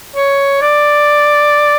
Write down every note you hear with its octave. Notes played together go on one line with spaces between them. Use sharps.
C#5
D5